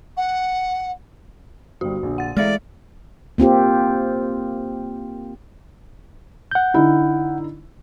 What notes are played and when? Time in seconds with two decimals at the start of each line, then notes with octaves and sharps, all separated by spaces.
0.17 F#5
1.81 G1 G3 F#4
2.03 A#1 D3
2.18 F#5 A6
2.37 E3 G#3 A3 D5 E5 F5 F6
3.38 A#3 C4 F4 G4
6.51 F#5 G6
6.74 D3 D#4 E4